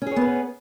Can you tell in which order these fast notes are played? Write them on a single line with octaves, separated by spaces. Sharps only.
C#4 G#4 C#5 B3 B4